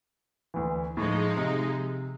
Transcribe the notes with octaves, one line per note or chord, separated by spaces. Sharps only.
D2 E3
A2 F3 G#3 D#4
C3